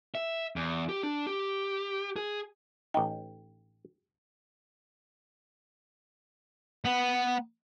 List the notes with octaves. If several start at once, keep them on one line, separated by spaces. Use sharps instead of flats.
E5
E2
G4
D4
G4
G#4
A1 D#4 G5
B3